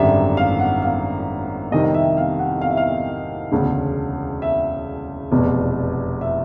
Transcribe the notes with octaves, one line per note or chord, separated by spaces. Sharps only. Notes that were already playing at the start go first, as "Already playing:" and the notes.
Already playing: G#1 F#2 D3 G3 E5
F5
F#5
F5
F2 C3 D#3 G3 D#5
D#5
E5
F5
F#5
F5
E5
F5
E1 D2 C#3
E5
F1 E2 B2
E5